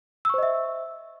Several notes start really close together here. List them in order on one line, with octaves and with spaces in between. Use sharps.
E6 C#6 C5 D#5 E5